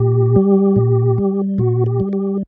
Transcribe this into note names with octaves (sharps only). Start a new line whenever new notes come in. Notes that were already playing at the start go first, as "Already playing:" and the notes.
Already playing: A#2 G4
G3
A#2
G3
A#2 F#4
G4
G3
G4